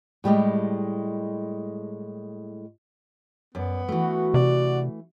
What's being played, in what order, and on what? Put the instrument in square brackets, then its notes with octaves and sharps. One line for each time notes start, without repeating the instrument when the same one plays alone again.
[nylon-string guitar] A2 G3 G#3 G4
[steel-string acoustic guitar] F#2 D5 [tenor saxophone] B3
[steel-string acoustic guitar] E3 A3 [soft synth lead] F#4
[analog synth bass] C3 [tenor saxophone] D5